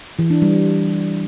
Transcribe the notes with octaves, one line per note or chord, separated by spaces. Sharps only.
E3
D4
G3